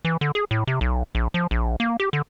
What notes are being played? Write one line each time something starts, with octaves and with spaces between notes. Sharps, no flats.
E3
D3
G#4
A2
C3
B1
A#1
F3
A#1
A#3
G4
D3